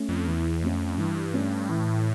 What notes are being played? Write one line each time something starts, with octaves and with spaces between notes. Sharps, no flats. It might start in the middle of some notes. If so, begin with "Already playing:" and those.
Already playing: A3 C#4
F2
E2 E3
F2 A3 C#4
G2 E3
A3 C#4
A2 E3